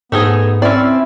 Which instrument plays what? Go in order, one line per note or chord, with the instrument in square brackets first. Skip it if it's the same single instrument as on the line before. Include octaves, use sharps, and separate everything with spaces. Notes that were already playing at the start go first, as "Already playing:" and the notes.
[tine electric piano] G#2 C5 [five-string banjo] A3 D#4 G#4 [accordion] B3
[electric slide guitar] C4 [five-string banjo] C#4 D5 [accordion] E4